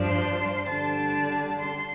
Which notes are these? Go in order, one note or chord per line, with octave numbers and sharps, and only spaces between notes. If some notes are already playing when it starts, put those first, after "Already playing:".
Already playing: G2 F3 D4
C6
D3 G3 D4 A5
C6